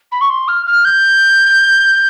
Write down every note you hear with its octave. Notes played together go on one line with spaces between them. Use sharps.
B5
C#6
C6
F6
F6
G6